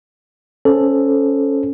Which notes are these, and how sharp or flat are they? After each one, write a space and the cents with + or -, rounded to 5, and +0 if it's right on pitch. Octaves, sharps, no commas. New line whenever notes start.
C#4 +0 A4 +0 C5 -15